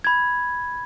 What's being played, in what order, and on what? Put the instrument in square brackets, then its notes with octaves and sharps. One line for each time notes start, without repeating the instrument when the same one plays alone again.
[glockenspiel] B5 G#6